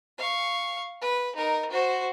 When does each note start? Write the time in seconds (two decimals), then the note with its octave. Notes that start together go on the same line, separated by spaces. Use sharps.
0.18 F5 C#6
1.01 B4
1.35 D#4 A#4
1.70 F#4 C5